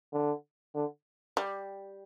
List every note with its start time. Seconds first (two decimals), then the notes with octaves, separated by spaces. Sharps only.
0.13 D3
0.75 D3
1.37 G3